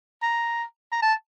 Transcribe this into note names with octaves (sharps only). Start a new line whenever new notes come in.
A#5
A#5
A5